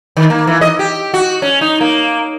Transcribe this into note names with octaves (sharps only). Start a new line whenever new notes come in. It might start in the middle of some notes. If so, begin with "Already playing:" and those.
D#3
A#3
E3
D#5
G4
F#4
C#4
D#4
A#3